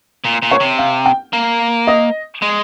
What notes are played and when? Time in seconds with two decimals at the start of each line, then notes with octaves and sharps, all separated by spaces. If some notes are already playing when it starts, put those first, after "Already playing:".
0.24 A#2
0.42 A#2
0.51 C#5
0.60 C3
0.78 F5
1.06 G5
1.33 A#3
1.87 D#5
2.42 G#3